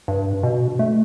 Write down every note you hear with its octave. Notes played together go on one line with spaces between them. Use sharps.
G2
B2
A3